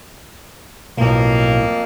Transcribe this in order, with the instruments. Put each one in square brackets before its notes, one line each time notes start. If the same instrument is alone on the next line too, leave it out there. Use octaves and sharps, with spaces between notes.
[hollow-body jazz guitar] B1 A2 [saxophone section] F2 A#3